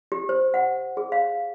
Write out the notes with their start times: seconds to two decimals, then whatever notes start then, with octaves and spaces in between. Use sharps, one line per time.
0.12 G4
0.29 C5
0.54 F#5
0.97 G#4
1.12 F5